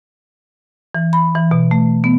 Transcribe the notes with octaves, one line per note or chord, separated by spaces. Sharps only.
E3
B5
E3
B2
A3
B3